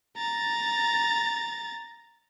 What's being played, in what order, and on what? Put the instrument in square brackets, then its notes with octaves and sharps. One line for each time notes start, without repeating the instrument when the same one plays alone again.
[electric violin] A#5 A6